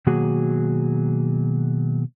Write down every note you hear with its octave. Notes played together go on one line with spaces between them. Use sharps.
B2 D#3 F#3 A#3 F#4 G#4